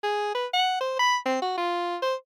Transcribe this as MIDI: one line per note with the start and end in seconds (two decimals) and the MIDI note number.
0.03 0.35 68
0.35 0.46 71
0.53 0.76 78
0.81 0.98 72
0.99 1.17 83
1.25 1.40 60
1.42 1.53 66
1.57 1.97 65
2.02 2.15 72